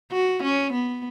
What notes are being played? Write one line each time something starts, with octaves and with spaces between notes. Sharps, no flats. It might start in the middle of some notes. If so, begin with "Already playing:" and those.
F#4
C#4
B3